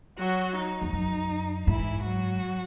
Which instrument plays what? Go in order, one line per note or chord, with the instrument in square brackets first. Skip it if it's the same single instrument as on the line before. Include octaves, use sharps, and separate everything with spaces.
[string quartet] F#3 F#4
D#4
[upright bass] E2
F#2
[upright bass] G#2 [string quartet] E3 E4
[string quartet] F#3 F#4